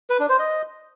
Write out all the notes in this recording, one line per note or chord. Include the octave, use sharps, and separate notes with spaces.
B4
D4
C5
D#5